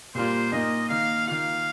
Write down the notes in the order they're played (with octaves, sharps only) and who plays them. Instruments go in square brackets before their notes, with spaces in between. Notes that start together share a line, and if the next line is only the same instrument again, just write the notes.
[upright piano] A#2 G3 A#3 F4 [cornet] C5
[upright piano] A#2 A#3 D#4 [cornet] D#5
[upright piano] D#3 A#3 D#4 [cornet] F5
[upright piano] D#3 A#3 F4 [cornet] F5